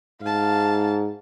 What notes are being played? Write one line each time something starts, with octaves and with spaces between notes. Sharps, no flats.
G#2 F5 A5